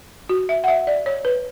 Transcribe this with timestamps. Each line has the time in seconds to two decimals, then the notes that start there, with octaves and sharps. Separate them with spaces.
0.29 F#4
0.49 E5
0.64 F#5
0.68 E5
0.87 D5
1.06 C#5
1.25 B4